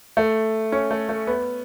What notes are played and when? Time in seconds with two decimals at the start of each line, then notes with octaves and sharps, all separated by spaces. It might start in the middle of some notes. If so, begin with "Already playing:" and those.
0.17 A3
0.72 C#4
0.91 A3
1.09 A3
1.27 B3